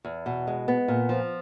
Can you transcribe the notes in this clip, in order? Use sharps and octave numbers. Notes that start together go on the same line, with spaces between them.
E2
B2
G#3
B3
A#2
F3